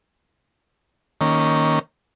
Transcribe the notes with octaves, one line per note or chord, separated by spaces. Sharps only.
D#3 A#3 C#4